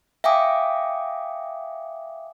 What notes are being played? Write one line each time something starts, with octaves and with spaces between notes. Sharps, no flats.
E5 F5 G5 G#5 D6 D#6